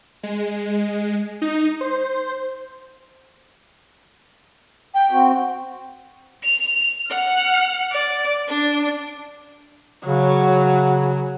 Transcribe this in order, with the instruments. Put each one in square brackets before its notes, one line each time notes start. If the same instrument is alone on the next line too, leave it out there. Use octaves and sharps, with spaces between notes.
[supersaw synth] G#3
D#4
C5
[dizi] G5
[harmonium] C4 F#4
[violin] F7
F#5 F6
D5
D4
[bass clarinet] C#3 [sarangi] F#3